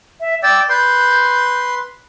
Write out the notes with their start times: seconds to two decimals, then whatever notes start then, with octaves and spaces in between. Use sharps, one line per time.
0.21 E5
0.43 D5 G5 E6 A6
0.69 B4 C6 G6